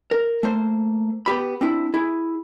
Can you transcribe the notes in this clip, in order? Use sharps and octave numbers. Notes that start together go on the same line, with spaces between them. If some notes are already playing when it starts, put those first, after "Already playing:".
A#4
A3 A#3 C5
B3 G4 B5
C4 D4 E4
E4 G#4